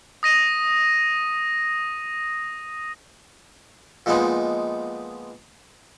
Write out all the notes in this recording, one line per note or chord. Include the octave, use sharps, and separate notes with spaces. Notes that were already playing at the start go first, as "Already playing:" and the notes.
D#6 A#6 D#7
A#2 F3 G#3 B3 D#4